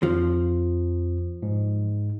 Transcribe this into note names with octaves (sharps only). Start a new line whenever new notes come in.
F2 F3
G#2